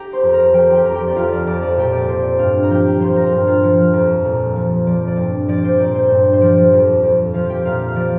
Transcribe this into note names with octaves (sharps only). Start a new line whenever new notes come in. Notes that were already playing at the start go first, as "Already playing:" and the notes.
Already playing: G4 G5 A#5
C5 C6
F2
A#4 A#5
F3 G4 G5
G4 G5
F2 A#5
G4 G5
D5
F2 F4 F5
D5
F2 D5
D5
A#2 G4 G5
D5
A#2 C5
D5
G2 F4 F5
A#5
F3 G4 G5
F3 C5 C6
A#4 A#5
G2
F4 F5
F3
F2
A#2
F3
F3 D5
D5
G2
F3 D5
C5
A#2 D5
C5
G2
C5
F3 D5
F2
F2
F3 F4 F5
G4 G5
A#2 F4 F5
F5
F3 D5